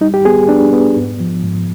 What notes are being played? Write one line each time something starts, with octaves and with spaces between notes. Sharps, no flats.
G3 D#4
G4
B3 G#4
B3 D4
B3
G#2
F3
G#2